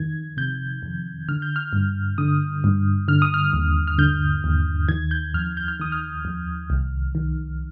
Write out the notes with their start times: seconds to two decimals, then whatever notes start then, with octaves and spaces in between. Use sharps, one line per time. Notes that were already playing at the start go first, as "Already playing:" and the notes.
Already playing: F2 D#3 G#6
0.37 C3 G6
0.83 F2
1.28 D3 F6
1.42 G6
1.56 F6
1.73 G2
2.18 D3 D#6
2.64 G2
3.08 D3 F6
3.22 D#6
3.34 F6
3.53 D#2
3.87 F6
3.98 D3 G6
4.44 D#2
4.89 D#3 G#6
5.11 G6
5.34 F2 F6
5.57 G6
5.68 F6
5.80 D#3 D#6
5.92 F6
6.25 F2
6.70 C2
7.15 D#3